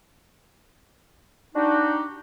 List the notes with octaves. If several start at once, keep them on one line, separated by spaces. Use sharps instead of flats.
D4 D#4 F#4 G4